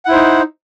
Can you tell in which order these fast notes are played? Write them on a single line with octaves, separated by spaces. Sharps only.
F#5 E4 C5 D#4